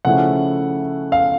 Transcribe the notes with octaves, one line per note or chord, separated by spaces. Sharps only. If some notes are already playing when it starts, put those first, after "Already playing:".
C#3 F3 A3 C#4 E4 F#5
F5